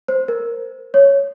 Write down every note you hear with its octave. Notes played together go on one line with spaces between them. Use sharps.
C5
A#4
C#5